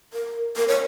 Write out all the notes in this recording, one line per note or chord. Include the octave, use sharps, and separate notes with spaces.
A#4
A#4
C#5